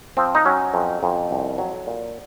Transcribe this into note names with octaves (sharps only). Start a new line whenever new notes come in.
F3 C4
D#4
F#3 C#4
F2
F2
C2
F#3
A#2